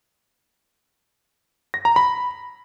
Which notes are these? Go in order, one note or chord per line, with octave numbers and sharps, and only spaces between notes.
A#6
A#5
B5